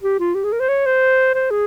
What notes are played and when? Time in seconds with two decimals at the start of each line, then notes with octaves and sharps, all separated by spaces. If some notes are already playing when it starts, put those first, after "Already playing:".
0.03 G4
0.20 F4
0.35 G4
0.44 G#4
0.52 A#4
0.60 C5
0.68 C#5
0.86 C5
1.34 C5
1.51 G#4